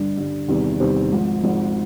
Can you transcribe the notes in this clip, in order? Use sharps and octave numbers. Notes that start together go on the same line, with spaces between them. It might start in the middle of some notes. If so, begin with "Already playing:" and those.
Already playing: G2 D3 G3
G2 D3 G3
E2 C3 D#3 G3 C4
E2 C3 D#3 G3 C4
G#1 G#2 F3
G#1 G#2 F3